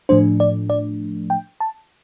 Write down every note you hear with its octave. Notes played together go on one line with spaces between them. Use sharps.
A2 F3 A3 D4 C5
D5
D5
G5
A5